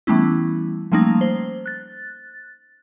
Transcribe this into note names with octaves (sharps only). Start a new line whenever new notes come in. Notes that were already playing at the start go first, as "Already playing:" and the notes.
E3 G3 A3 B3 C#4 E4
F3 G3 A3 A#3 C#4 D#4
C5
F#6 A6